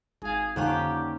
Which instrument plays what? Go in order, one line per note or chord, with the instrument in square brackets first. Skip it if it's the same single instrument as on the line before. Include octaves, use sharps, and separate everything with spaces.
[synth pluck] G#1 F5 [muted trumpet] G#4
[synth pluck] F2 D3 F#6 [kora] D#3 A#3 C#4 [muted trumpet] G4